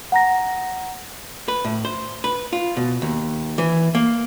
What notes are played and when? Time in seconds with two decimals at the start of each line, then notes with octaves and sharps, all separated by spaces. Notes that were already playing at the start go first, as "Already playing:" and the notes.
0.12 F#5 A#5 A#6
1.48 B4
1.65 A2
1.85 C5
2.24 B4
2.53 F4
2.77 B2
3.02 D#2
3.58 E3
3.95 A#3